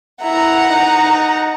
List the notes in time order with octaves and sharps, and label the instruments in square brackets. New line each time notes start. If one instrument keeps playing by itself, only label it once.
[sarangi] E4 [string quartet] F#5 A#5
[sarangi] D#4